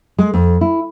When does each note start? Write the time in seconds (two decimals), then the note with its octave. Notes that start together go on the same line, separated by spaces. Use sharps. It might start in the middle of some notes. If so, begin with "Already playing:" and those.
0.18 G#3
0.34 F2
0.61 E4